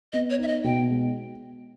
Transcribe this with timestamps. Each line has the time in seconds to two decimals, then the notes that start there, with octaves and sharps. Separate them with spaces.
0.13 B3 D#5
0.30 C#5
0.38 D#4 E5
0.48 D#5
0.64 B2 G5
0.90 G#3